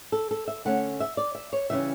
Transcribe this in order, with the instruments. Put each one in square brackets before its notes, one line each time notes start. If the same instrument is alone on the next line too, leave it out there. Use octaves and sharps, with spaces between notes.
[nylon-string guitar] A4
A4
E5
D3 A3 C#4 F#5
E5
D5
E5
C#5
C#3 E3 G3 C#4 E5